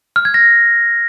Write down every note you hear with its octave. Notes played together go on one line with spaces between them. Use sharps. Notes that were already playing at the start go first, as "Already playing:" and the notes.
F6
G#6
A#6